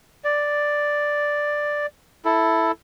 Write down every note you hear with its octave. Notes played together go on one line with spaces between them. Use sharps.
D5
E4 A4